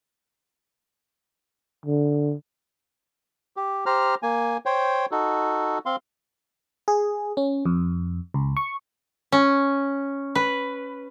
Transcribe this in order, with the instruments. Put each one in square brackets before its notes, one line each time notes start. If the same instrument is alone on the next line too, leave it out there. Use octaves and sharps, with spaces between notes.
[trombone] D3
[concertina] G4
G4 C5 A#5 F6
A#3 G#5
C5 C#5 G5
D#4 F#4 A4
C4 F5 C6
[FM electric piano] G#4
C#4
F2
C#2
C#6
[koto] C#4
B4